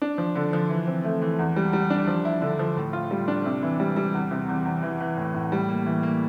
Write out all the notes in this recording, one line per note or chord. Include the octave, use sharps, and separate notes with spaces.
D4
F3
D3
F3
E3
C4
A3
E3
E2
G3
G3
D4
F3
E4
D3
F3
A2
F4
G3
D4
C3
E3
G3
G3
E2
C3
E2
E2
E3
E3
A2
A2
G3
A#3
E3
A#3